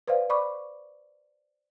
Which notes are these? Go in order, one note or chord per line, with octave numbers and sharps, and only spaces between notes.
B4 C5 D5 F5
D5 B5 C#6 D6